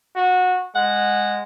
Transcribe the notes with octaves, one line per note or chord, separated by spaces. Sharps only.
F#4
G#3 F#5